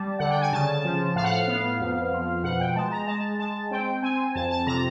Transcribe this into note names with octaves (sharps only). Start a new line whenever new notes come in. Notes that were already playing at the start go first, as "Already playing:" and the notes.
Already playing: G3 A5
D3 F#5
G5
G#5
C#3 A5
F3
A2 F5
F#5
F5
B3
F2
F3
B2 F#5
G5
G#3 A5
A#5
G#3 A5
G#3 A5
C4 G5
C4 G#5
F2 A5
A5
C3 A#5